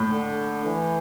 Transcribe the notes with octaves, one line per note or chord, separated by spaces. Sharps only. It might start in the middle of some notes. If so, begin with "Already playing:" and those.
Already playing: A2
D3
E3